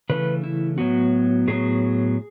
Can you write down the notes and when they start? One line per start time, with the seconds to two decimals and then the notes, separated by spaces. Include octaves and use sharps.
0.09 C#3 E3 A3 C#4 B4
0.44 E4
0.78 A2 F#3 B3 F#4
1.48 A2 F#3 B3 G#4